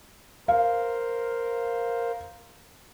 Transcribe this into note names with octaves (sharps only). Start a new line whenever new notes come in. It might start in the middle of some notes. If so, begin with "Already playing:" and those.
A#4 C5 F5